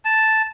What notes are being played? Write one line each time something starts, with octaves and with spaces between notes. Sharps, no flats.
A5